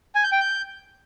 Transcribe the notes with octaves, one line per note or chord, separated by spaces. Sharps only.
G#5
G6
G5
G6